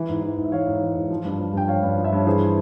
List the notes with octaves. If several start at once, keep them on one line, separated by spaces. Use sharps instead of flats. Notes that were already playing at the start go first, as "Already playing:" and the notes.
Already playing: E3
G#2
E3
G#2
E5
E3 C#5 F5
G#2
E3
G#2
F3
G2
F3
G2 G5
F3 C#5 F5
G2
F3
E5
G2 C#5
E3 G#4 C5